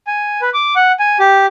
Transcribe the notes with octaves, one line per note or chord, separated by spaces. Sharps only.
G#5
B4
D6
F#5
G#5
G4